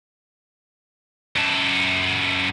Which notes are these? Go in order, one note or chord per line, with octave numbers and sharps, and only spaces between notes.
F#2 A4